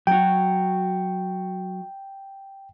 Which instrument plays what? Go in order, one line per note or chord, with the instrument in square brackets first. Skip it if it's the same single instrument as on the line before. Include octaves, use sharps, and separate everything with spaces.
[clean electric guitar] F#3 F#4 [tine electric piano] G5